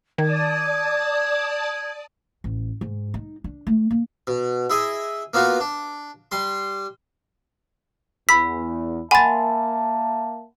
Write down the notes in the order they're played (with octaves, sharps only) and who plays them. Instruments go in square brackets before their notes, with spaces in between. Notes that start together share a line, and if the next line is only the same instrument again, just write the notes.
[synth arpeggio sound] D#3 [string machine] D5 A5 D#6 [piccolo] G#6
[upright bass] A1
G#2
D#4
D4
A3
A#3
[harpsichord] B2
E4 G#4 D#5
A#3 B3 F4 F#4
D4
G3 C6
[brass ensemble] E2 [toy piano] B5 E6 [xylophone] B6
[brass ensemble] A#3 E5 A5 [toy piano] F#5 B5 C6 [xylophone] G#5 A6